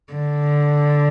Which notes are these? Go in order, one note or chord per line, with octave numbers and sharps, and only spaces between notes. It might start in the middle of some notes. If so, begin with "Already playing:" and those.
D3